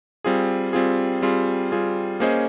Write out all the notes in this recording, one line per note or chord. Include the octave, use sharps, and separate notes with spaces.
G3 C4 F4 G#4
G3 C4 F4 G#4
G3 C4 F4 G#4
G3 C4 F4 G#4
A#3 C#4 G#4 C5 D#5